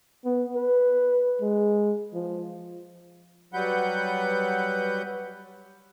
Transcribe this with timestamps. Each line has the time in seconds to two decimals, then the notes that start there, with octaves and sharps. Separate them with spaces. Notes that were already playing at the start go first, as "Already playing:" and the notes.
0.25 B3
0.55 B4
1.41 G#3
2.14 F3
3.53 F#3 G3 B4 F#5 G6